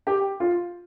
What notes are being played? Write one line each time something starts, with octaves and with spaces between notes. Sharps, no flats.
G4
F4